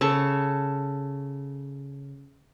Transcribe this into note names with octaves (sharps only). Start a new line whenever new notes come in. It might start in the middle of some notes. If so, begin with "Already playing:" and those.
C#3 A4 A5 C#6